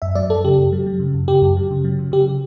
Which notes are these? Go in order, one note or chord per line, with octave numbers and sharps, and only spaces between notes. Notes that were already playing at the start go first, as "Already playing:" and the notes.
F#2 E5
F#3 D5
F#2 A4
C#3 G4
F#2
F#3
F#3
C#3
F#2
C#3 G4
F#2
F#3
C#3
F#3
C#3
C#3 G4